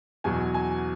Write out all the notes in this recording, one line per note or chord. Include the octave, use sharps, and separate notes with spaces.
E2 B2 F#3 G#5
G#5